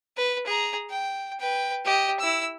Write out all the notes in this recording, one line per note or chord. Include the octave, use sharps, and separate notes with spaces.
B4
G#4 A#5
G5
B4 G5
G4 D#5
E4 E6